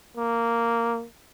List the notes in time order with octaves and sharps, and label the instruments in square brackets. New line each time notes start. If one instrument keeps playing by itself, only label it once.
[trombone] A#3